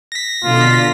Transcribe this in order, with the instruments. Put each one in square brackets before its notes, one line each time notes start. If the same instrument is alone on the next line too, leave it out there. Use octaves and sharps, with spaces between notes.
[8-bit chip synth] A#6 B6
[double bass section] B2 D3 [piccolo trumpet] F4